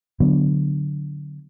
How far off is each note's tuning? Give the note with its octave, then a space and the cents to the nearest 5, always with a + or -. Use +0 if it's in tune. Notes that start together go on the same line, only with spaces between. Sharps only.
D3 +0 F#3 +0 B3 +0